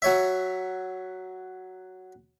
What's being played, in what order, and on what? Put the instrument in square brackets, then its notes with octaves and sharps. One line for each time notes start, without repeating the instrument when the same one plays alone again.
[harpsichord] F#3 C#5 E5